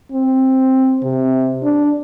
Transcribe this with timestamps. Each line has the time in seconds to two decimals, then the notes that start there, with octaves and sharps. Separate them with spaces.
0.12 C4
1.03 C3
1.63 D4